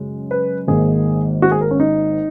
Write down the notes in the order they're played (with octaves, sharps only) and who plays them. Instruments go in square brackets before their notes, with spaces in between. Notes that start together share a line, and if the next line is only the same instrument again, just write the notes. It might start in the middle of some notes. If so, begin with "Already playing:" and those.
Already playing: [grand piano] F#2 C#3 G#3
B4
G#1 G#2 D#3 A#3 G#4
F#4
G#4
A#4
C#4
D#4